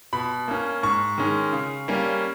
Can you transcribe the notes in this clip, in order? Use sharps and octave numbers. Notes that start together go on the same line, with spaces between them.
B2 B5
A#3 C#4
G#2 C#6
D#3 G#3 C#4
C#3
G3 A#3 C#4